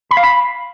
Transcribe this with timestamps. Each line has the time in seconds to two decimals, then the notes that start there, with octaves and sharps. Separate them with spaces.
0.11 B5
0.17 F5
0.23 B5